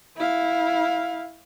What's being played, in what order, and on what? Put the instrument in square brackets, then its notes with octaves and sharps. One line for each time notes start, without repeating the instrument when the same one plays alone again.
[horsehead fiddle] E4 F5